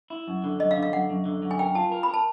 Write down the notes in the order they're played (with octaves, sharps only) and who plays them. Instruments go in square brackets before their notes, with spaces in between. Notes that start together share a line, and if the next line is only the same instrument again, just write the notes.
[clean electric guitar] E4
F#2
D3
[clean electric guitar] F#2 [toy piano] D#5
[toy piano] F5
[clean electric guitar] D3
[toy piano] F5
[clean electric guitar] F#2 [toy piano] F#5
[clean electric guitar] F#2
D3
F#2
[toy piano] G#5
[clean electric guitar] A#4 [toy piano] G5
[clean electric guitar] F4 [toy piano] A5
[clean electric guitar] A#4
[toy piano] B5
[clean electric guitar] A#4 [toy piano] A5